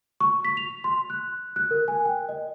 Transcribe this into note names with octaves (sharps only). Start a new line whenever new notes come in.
C#6
B6
F7
C6
F#6
F#6
A#4
G#5
G5
D#5